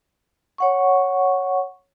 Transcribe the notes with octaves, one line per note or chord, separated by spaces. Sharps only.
C#5 F#5 C#6